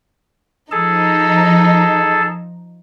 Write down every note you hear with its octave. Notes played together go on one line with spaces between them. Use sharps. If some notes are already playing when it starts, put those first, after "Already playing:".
F3 D#4 G#4 A4 A5